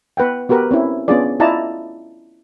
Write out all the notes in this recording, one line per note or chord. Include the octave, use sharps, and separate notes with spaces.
B3 B4 F#5 G5
B3 F#4 G4 A#4 B4
C4 C#4 E4
B3 C#4 D4 F4 G#4 D5
E4 F4 D5 D#5 A5 A#5